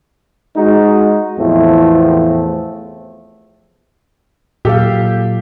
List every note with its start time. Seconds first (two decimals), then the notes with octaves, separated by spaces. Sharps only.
0.56 G#3 D#4 F#4
1.39 E2 A2 F3 A3 B3 C4
4.65 A#2 F#3 G4 A4 F5